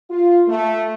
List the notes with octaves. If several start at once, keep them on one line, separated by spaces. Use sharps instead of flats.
F4
A3